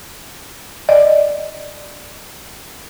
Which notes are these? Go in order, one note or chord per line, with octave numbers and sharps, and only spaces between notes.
D5 D#5